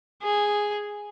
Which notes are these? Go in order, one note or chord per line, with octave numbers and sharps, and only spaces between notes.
G#4